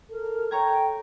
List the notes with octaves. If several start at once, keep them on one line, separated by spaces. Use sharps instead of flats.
A4 A#4
C#5 G5 A#5 G#6